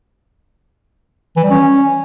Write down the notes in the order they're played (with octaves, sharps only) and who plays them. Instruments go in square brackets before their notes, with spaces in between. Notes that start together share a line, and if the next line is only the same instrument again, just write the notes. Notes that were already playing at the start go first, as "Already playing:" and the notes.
[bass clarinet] E3
G3
C#4